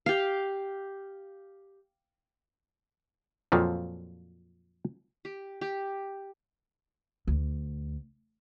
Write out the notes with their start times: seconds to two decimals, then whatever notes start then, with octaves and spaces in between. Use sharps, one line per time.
0.06 G4 F5
3.52 F2 A#2 F3 F#3
5.25 G4
5.61 G4
7.27 D2